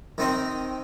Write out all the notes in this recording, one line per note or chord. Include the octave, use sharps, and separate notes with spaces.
D#3 C4 D#4